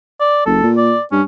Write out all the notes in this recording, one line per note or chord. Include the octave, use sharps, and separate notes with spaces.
D5
F#1 A4
A#2
D5
G2 C#4